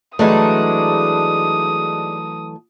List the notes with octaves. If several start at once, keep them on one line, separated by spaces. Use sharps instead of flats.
E3 F#3 G#3 A3 D4 D#4 D#6